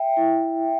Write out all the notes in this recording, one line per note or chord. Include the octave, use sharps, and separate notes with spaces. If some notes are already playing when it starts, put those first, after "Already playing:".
Already playing: E5 G5
E4